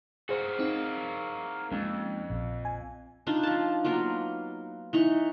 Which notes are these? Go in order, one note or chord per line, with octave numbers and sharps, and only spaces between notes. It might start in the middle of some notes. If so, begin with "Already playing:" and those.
A#3 F#4 G#4 C5
C4 D#4
F2 G#3 A#3 C#4
A#1
G#5
D4 D#4 F4
F3 A5
F#3 A#3 B3 F4
E3 D#4 C#6